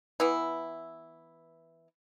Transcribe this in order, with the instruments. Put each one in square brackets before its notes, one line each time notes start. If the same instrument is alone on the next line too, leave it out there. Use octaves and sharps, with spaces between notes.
[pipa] E3 B3 E4